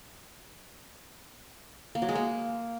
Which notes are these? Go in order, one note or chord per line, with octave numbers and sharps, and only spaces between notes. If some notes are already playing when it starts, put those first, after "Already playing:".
A#3
F#3
G#3
A#3